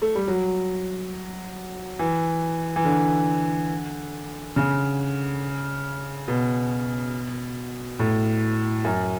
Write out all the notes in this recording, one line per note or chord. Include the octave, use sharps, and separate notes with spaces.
A3
G3
F#3
E3
E3
D3
C#3
B2
A2
F#2